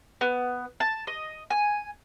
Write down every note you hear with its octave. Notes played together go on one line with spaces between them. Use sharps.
B3
A5
D#5
G#5